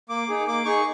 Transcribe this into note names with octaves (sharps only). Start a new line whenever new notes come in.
A#3 D6
D#4 G#4
A#3 D6
D#4 G#4 C#6